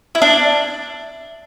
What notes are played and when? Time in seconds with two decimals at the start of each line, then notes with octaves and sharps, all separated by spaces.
0.15 E4
0.22 D4